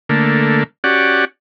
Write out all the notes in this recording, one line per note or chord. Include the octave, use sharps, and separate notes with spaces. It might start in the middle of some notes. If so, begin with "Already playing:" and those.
D3 A3 A#3
C#4 F#4 G4 D5 F#5